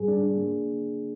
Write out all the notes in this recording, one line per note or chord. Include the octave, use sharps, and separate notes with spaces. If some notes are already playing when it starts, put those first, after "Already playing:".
Already playing: G#2 G3 G#4
D4
D4
A#3